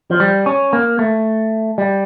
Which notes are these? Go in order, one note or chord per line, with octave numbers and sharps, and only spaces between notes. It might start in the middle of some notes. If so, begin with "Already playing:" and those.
F3
G3
C#4
A#3
A3
G3